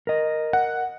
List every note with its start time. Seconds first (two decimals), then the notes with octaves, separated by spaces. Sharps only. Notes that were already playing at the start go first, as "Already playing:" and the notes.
0.07 A#4 D#5
0.53 F#5